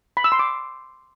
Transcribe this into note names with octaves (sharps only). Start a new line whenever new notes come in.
B5
E6
C6
D6